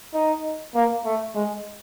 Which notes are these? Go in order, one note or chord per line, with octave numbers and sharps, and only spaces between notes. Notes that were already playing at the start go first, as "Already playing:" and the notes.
D#4
A#3
A3
G#3